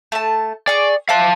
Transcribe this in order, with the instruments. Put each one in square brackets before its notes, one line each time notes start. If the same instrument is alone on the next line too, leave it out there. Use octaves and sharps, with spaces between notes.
[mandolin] A3 A5
[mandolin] G#4 C#6 [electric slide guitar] D5
[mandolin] E5 D6 F#6 [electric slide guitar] F5 A5